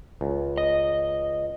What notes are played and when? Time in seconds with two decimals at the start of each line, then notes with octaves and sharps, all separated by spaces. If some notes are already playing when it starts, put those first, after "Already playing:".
0.21 C#2
0.58 D#5